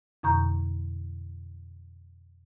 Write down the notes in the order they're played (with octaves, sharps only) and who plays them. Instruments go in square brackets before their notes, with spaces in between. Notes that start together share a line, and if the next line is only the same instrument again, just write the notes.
[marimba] F2 B2 D3 A#5 C#6 G6